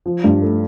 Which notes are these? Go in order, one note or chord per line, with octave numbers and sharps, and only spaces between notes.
F3
G2
A3